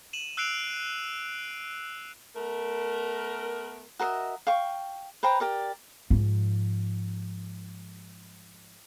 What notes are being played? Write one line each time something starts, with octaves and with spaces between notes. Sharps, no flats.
D#7 E7 F#7
E6 F#6 C7 D7 F7
A3 B3 A#4
F#4 A#4 D#5 E5
F5 G5 C#6
B4 C5 G5 A#5
G4 A#4 D5
G#2 F3